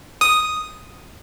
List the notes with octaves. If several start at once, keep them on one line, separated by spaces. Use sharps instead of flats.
D#6